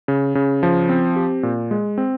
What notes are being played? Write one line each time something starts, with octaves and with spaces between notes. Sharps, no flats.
C#3
C#3
F3
C4
G4
A#2
G#3
C4